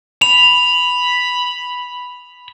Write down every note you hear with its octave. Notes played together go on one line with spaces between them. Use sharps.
B5 F7